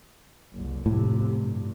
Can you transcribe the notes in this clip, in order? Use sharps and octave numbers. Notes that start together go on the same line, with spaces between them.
F#1 C2
F2 A2 C3
G2